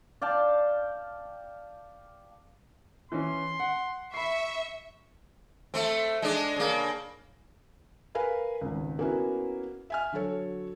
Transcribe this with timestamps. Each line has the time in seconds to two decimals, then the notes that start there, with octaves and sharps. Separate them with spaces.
0.22 D5 F5 G5 A5
3.12 E3 C#4 C6
3.60 F#5
4.14 E5 B5 C#6 C7
5.74 A3 C4
6.22 G#3 D4
6.56 C#3 A#3
8.15 A#4 B4 F5 G#5 B5
8.61 G#1 C#2
8.99 A#3 B3 C#4 E4 F#4
9.90 E5 G#5 F6
10.12 D3 F#3 F#4 A4 C#5